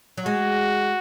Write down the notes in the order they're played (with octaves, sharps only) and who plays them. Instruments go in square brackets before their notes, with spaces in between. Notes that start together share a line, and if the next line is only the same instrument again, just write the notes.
[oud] F#3
[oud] G#3 [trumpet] F#4